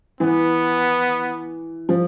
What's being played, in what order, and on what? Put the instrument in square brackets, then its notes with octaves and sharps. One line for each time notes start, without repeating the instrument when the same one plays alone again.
[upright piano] E3 [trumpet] B3
[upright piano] F3